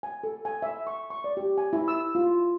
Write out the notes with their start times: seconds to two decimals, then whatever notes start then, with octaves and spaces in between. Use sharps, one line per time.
0.03 G#5
0.23 A4
0.45 G#5
0.62 E5
0.87 C#6
1.10 C#6
1.24 D5
1.37 G4
1.58 G#5
1.73 E4
1.88 E6
2.15 F4